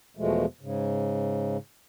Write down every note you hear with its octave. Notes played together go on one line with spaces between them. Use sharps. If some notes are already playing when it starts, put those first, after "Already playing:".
E2 B2 F3 G#3 A3
G#2 C#3